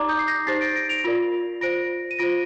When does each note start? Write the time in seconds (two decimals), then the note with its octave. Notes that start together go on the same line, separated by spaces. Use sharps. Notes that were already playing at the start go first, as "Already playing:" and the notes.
Already playing: D#4 G4 D5 A#5 D6
0.09 D#6 G6
0.19 C7
0.27 G6 A#6
0.47 D#4 G4 C5 A6 C7
0.61 A#6 D7
0.75 A#6 D7
0.89 D7 F7
1.04 F4 A#4 D5
1.61 F4 C5 A#6 D7
2.11 D#7
2.19 F4 C5 A#6 D7